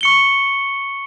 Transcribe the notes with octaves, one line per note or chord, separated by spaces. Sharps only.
C#6 C#7 G7